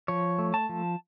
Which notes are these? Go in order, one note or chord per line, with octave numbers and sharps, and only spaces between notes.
F3 C#5
A3
A5
F3